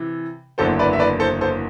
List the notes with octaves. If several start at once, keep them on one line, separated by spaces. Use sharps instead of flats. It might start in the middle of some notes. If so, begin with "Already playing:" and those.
Already playing: C3 E3
F#1 E2 D3 F#3 A4 C5
B4 D5
E5
B4 D5
A4 C5
A4 C5